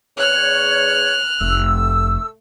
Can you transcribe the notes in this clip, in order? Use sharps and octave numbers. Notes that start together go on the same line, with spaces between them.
E2 C#5 F6 F#6
F1 A3 E6